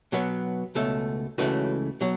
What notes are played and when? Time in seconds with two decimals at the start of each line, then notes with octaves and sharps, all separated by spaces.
0.12 B2 F#3 B3
0.75 C#2 B2 A3
1.38 C#2 C#3 E3 A3 F#4 B4
2.01 B2 F#3